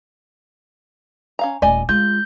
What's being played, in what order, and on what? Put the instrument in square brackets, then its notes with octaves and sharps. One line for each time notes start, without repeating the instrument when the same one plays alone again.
[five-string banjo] C#4 F5 A#5
[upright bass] D#1 A3 [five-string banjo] D5 D#5 G#5
[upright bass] G#3 [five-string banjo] F4 [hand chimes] G6